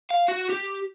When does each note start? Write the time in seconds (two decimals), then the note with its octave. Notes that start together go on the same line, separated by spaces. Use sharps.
0.11 F5
0.28 F#4
0.50 G4